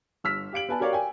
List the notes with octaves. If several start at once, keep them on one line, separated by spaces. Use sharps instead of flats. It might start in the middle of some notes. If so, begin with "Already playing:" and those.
G1 E6 F6 B6
G4 F5 D7 F#7
B3 B4 G#5 A5
F#4 G4 A#4 C#5 D5 F5
G5 G#5